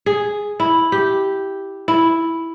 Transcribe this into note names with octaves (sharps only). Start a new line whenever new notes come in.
G#4
E4
G4
E4